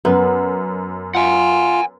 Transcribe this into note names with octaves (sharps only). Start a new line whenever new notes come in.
F#2 B3
F4 F#5 G#5